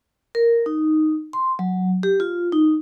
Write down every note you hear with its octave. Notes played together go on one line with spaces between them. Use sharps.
A#4
D#4
C6
F#3
G4
F4
D#4